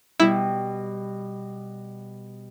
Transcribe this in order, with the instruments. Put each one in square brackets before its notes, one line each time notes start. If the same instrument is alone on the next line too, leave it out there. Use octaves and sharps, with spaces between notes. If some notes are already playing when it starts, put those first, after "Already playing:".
[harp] B2 G3 [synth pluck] E4